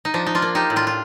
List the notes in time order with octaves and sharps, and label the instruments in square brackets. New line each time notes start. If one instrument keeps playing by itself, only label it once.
[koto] D#4
F3 D4
D#4
D4 F4
A#3
D#4 G4
A2
D4 F4
F4